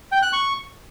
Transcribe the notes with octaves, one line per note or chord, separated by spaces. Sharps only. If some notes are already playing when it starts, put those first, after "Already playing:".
G5
F#6
C#6